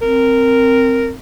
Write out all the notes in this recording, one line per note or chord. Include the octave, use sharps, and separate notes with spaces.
C4 A#4